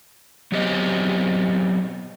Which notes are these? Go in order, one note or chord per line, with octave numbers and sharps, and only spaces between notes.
F#3 B3 C4 G4 D#5